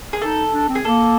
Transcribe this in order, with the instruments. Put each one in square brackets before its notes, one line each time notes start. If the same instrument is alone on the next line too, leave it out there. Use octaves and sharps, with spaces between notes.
[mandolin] G#4
[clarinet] D#4 [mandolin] A4
[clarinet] D4
C4
[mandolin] G#4
[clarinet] A#3 [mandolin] A4